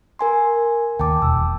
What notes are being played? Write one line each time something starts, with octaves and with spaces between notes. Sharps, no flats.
A#4 G#5 C6
D#2 G5 A5 D6
E1 E6